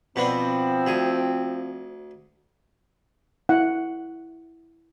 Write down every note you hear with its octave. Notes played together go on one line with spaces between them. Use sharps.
B2 F3 B3 C4 D4
D2 G#4
E4 F#5